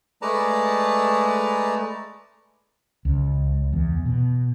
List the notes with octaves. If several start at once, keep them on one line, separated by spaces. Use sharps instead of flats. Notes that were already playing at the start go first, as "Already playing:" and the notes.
G#3 A3 B4 D5 A5 A#5
C#2
E2
B2